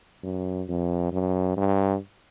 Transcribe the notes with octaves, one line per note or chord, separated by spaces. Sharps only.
F#2
F2
F#2
G2